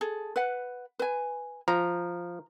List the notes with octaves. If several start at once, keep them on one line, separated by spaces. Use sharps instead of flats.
G#4 A4
B4 F#5
B4 G#5
F3 A#5